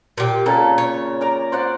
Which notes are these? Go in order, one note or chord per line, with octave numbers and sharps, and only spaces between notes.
A#2 G4
A#2 C#3 A#3 A4
C#5
A#4 D5 A#5
C5 D5 F#5